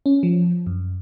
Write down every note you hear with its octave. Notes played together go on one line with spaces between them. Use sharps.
C#4
F3
F#2